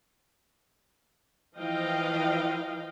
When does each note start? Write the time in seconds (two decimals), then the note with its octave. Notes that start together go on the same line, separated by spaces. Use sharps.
1.58 E3 F3 D#5 F5 G5